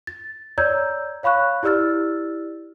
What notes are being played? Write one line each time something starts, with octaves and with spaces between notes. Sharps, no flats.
A6
C#5 D5 A#5 E6 G6 G#6
C#5 F5 B5 C#6 F#6
E4 G4 D5 E6 F6 A6